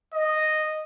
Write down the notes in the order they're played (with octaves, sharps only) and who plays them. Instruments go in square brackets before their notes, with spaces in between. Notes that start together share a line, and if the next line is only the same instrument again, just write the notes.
[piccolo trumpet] D#5